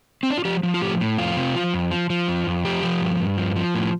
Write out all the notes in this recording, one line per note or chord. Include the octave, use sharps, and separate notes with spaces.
C4
D4
F4
F3 G4
F3
F4
A2 G4
A2
F2 F4
C3
F3
F2
F3
F3
F2
F2
F3 G4
F3
G2
G2
F3
F3
A2